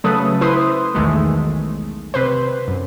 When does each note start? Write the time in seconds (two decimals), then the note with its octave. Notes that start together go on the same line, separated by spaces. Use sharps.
0.04 C#3 F#3 A3 A4 B4 D#6
0.41 E4 B4 C5 C6 D#6
0.95 B1 E2 D#3 G#3 A3
2.14 C3 B4 C5
2.68 F#2